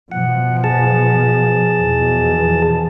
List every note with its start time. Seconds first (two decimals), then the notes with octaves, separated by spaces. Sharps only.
0.12 B2 F3 F#5
0.64 G#4 A5
1.79 E2 B2 F3